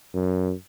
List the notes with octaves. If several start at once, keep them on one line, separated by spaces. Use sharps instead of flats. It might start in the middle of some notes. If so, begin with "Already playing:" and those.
F#2